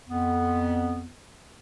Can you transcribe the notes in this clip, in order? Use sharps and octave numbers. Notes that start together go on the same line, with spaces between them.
F2 B3